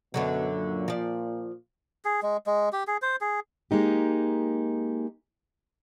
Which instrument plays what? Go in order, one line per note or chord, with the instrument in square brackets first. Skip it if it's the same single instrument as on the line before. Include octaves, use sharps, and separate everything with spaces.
[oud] F#2 D3 F#3 [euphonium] B2
[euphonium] A#2
[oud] F3 D5
[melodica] G#4
G#3
G#3
G4
G#4
C5
G#4
[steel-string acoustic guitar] G#3 A#3 D#4 G4